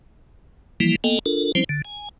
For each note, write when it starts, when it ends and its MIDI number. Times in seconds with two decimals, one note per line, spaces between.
0.80 0.96 52
0.80 0.96 53
0.80 0.96 55
0.80 0.96 58
0.80 0.96 64
1.04 1.19 58
1.04 1.19 59
1.04 1.19 69
1.04 1.19 75
1.04 1.19 79
1.04 1.19 80
1.26 1.52 62
1.26 1.52 65
1.26 1.52 69
1.26 1.52 70
1.55 1.64 53
1.55 1.64 55
1.55 1.64 60
1.55 1.64 61
1.55 1.64 64
1.55 1.64 72
1.69 1.82 50
1.85 2.09 80